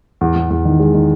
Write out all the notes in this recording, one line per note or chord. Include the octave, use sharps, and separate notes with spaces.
E2
E2
E2
D#3
G#3
D#3